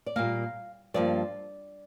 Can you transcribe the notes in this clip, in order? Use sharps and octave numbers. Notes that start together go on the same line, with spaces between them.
D5
A#2 G3 A#3 F5
G2 F3 A#3 D5